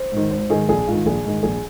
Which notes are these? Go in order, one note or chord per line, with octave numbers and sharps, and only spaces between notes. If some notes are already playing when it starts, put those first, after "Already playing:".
Already playing: C5
G#2 D#3
G#1 C5
G#2 D#3 G#4
A#1 G#4
G#2 D#3 F4
A#1 G#4
G#2 D#3
A#1 G#4